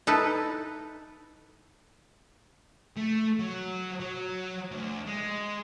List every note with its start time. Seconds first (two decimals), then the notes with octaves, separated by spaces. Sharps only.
0.07 D#4 E4 A4 B4
2.97 A3
3.39 F#3
4.00 F#3
4.71 D2
5.07 G#3